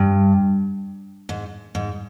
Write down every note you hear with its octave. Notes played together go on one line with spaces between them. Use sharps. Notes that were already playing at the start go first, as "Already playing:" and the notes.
Already playing: G2
G#2
G#2